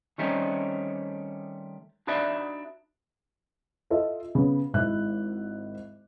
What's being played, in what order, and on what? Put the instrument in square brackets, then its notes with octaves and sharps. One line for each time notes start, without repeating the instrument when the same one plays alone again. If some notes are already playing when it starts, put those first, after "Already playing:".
[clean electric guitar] D#3 G3 A3 C4 C#4 D#4
D4 D#4 F#4 B4 D5 E5
[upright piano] F4 A4 D#5 E5
C#3 B3
G#1 G#2 E4 F#6